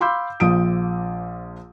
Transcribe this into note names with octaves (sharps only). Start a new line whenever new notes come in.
F5 B5 C6 D6 E6 G6
A#1 F3 D#6 D7